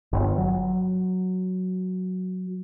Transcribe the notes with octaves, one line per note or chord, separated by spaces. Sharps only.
G1
F#3